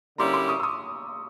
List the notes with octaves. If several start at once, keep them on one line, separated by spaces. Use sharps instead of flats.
D3 G3 A#3 C#4 E4 A#5 C6
C6 D6
C#6 D#6
E6
C#6 D#6